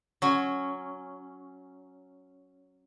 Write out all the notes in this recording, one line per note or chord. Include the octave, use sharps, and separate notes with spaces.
F#3 C#4